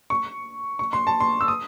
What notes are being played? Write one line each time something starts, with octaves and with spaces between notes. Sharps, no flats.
C#6
C#6
C6
A5
C6
E6
D#6